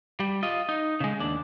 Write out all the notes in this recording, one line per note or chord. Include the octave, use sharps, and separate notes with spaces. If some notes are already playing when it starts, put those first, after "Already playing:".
G3
F4 D#5
D#4
C#3 G#3
D#2 D4